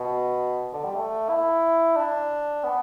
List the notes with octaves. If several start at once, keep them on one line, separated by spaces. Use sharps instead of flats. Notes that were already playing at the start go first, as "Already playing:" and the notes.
Already playing: B2
D3
G3
A3
E4
D4
B3